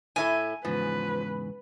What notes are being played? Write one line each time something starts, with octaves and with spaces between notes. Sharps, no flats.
A2 E4 A4 G#5
E2 G#2 C#3 F3 B4